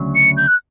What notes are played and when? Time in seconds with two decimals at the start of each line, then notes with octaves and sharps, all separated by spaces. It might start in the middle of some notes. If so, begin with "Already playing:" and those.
Already playing: D2 C#3 F#3
0.15 C#7
0.37 G6
0.47 F#6